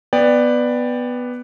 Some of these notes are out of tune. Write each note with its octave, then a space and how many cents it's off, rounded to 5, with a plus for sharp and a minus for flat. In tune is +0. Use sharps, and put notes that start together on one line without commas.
B3 +0 D5 +10 G5 +20